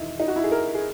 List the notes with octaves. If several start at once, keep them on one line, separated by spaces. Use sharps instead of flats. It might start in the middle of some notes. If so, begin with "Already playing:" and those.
Already playing: E1 E2 D#3 D#4 E4
D#4
F#4
E4
G#4
A#4
G#4